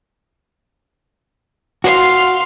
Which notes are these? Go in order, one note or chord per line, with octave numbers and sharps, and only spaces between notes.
F#4 F5 C6